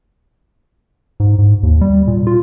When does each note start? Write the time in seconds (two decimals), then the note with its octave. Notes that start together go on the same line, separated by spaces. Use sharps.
1.20 G#2
1.38 G#2
1.63 D#2
1.81 G3
2.07 A#2
2.27 F4